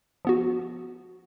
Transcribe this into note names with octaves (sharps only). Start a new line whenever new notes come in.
F3 B3 F#4